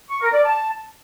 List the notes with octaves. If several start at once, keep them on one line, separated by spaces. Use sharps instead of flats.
C#6
A#4
D5
A5